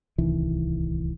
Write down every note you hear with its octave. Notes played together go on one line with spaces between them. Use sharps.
D1 C2 D#3 E3